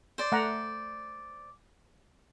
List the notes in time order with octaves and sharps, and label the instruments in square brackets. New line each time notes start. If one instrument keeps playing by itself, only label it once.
[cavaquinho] C5 D5
[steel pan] A3 F#5 A#5